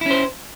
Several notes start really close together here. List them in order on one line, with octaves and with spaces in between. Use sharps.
E4 C#4 C5